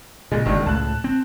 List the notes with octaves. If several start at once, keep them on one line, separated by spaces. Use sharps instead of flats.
A#2 C#3 G#3
F#1 F#2 D#3 G#3 D4
C#2 A2 A5 F#6
C4